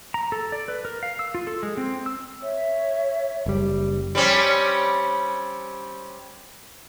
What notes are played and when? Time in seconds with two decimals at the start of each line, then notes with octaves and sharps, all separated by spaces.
0.14 A#5
0.32 A4
0.52 D5
0.68 B4
0.85 A#4
1.03 F5
1.19 E6
1.35 F4
1.47 A4
1.63 G#3
1.77 C4
2.06 E6
2.41 C#5 E5
3.46 F#1 G3
4.15 G3 C4 C#4